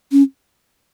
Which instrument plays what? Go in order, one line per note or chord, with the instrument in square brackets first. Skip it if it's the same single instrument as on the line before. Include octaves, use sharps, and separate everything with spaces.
[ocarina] C#4